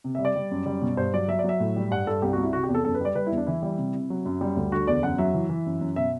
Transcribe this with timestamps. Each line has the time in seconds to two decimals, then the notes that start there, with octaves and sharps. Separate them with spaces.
0.04 C3
0.15 G3 E5
0.25 D5
0.36 G3
0.51 F#2
0.66 G3
0.81 B2
0.97 G2 C5
1.14 F#3 D5
1.28 F#3 E5
1.39 D5
1.44 F#3 E5
1.60 A2
1.76 G3
1.91 G2 F#5
2.07 G2 A4
2.22 C2 G4
2.33 F#4
2.37 C2
2.43 E4
2.53 C3 F#4
2.63 G4
2.69 E2
2.75 A4
2.85 F#2 A4
2.95 B4
3.01 G3 D5
3.15 G3 B4
3.26 E4
3.32 E2
3.37 D4
3.47 E3 E4
3.62 G3
3.78 C3
3.94 C3
4.10 F#3
4.25 F#2
4.41 G3
4.57 D2
4.72 D3 F#4
4.87 E2 D5
5.03 F#2 F#5
5.18 F#3 E5
5.34 E3
5.50 E3
5.66 F#2
5.81 F#2
5.96 B2 E5